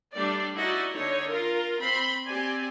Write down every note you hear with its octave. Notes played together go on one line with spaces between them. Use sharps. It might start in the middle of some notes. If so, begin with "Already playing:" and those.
G3 A3 D4 D5
D#4 E4 F#4 D5 D#5
D3 D#4 C#5
F4 A#4
C4 B5 C6
C4 G4 D5 G#5